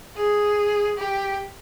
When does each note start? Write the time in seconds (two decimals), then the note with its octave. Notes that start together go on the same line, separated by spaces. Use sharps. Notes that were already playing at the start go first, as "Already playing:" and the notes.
0.17 G#4
0.97 G4